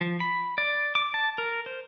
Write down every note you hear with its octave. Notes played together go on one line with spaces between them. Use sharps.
F3
B5
D5
D6
A5
A#4
C5